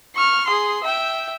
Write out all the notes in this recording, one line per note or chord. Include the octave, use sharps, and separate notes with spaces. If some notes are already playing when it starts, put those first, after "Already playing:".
C#6 F6
G#4 C6
E5 G5